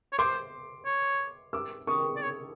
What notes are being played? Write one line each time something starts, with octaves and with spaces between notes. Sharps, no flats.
C#5
C5 C6 D6
C#5
D6 E6
C#6 D#6
D5
C#5